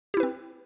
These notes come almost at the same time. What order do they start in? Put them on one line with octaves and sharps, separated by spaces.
G4 E4 B4 C4